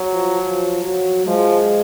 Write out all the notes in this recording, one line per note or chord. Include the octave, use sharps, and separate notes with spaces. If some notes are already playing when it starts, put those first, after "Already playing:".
Already playing: F#3
F3
F3
F#3
F3 G#3